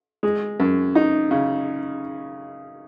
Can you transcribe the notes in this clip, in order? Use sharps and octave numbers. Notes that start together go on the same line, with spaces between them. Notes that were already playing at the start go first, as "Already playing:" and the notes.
G#3
F#2
D#4
C#3